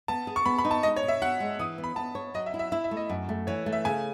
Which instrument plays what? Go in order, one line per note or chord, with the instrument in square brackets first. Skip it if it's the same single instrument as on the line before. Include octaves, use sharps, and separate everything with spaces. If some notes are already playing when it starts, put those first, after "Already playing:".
[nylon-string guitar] B3 [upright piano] A5
[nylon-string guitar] G#4
[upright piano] C#6
[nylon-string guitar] B3 [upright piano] B5
[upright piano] B5
[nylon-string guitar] D#4
[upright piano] A5
[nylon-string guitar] G#3 [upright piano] D#5
[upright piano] C#5
[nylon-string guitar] B2
[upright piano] E5
[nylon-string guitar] F#4 [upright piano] F#5
[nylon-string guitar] G#3
[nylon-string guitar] E3 [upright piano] D#6
[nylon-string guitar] B3
[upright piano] B5
[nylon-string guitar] B3 [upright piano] A5
[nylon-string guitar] C#5
[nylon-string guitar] F#3 [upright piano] D#5
[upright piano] E5
[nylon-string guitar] E4
[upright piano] E5
[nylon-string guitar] E4 [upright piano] E5
[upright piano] E5
[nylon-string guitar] A3
[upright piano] D#5
[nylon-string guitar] F#2
A3
[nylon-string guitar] E3 [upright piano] C#5
[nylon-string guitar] A3
[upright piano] E5
[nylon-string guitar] C#3 [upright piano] G#5